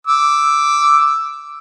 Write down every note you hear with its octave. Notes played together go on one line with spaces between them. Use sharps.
D6 E6